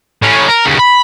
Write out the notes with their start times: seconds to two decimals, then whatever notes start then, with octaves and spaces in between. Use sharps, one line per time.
0.22 A2 C#4
0.48 A#4
0.66 D#2 C#3
0.79 B5